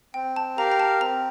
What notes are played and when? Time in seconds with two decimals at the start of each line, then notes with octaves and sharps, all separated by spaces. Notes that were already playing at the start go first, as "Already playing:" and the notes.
0.14 C4 G5
0.36 A5
0.58 G4 A#4 F5 A#5
0.72 A#5
0.80 A5
1.01 C4 A#5